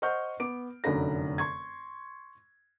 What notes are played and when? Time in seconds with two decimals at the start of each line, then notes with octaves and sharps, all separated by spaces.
0.02 C5 D#5 F#5 C#6 F6 G6
0.40 B3 D6 D7
0.84 F1 F#2 D3 D#4 B4 A#6
1.38 C6 C#6 G#6